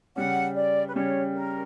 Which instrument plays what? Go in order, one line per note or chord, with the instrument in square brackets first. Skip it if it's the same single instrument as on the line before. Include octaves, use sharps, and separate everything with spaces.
[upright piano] C#3 G3 C#4 [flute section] F#5
[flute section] D5
B4
[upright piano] C#3 G3 C#4 [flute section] C#5
[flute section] A#4